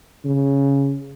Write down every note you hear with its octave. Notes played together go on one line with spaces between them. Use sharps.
C#3